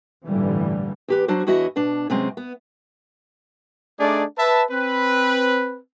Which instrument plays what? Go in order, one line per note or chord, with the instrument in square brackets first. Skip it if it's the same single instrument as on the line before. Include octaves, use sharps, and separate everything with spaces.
[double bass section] A1 G2 A#2 D3 E3 G3
[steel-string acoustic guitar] E2 G4 B4
F#3 D4 F#4 C5
E2 E4 F#4 C#5 D#5 E5
B2 D4
C3 F#3 G#3 C4 C#4
B3
[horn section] A3 D4 D#4 G#4 D5
B4 E5 A5
C4 B4